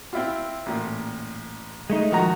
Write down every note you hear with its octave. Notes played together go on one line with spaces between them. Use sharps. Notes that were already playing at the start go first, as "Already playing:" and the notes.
C4 E4 F4
A1 A#2
G#3 A3 D#4
D#3 F3 F#4 A#5